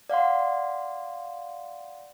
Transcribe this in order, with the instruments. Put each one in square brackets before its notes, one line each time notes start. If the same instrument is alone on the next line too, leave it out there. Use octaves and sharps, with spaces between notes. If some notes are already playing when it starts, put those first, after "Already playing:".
[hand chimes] D5 F5 F#5 C6